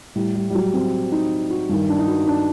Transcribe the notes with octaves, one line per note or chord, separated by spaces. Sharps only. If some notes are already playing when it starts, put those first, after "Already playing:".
A2 G3
G3
G3
F#3
C4
D#4
F#4
G2 D#3
D4
D#4
F#4
D4